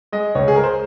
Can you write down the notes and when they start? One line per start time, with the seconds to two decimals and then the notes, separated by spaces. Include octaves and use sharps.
0.12 G#3 D#5
0.35 C#2 C#5
0.48 G#4
0.56 G#3 A#4
0.64 C5